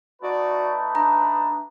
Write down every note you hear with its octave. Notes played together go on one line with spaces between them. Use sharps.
A3 D#4 F#4 B4 D5
D4 A#5